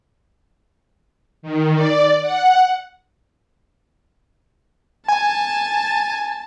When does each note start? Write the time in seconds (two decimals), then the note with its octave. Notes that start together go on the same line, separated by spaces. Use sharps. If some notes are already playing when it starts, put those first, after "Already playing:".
1.42 D#3
1.74 D5
2.22 F#5
5.08 G#5 A5